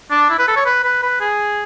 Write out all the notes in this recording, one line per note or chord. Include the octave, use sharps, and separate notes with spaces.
D4
E4
B4
A4
C#5
B4
B4
B4
G#4